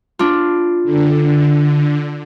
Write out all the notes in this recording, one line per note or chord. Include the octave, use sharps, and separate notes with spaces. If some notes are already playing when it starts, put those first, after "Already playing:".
D4 F4
D3